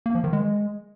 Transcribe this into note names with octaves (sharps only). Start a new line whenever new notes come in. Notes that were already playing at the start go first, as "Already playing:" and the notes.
A#3
F3
D#3
G#3